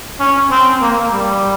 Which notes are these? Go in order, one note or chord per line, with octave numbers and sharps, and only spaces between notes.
C#4
C4
A#3
G3